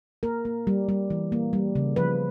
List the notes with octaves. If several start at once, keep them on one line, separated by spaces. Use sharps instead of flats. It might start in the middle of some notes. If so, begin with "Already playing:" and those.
A#3 A#4
A#3
G3
G3
E3
A#3
G3
C#3
F3 B4